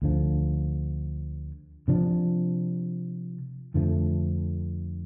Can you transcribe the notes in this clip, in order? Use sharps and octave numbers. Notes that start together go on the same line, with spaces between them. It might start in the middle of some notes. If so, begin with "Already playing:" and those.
D2 D3 F3
C3 F3 D4
F2 D3 F3 A3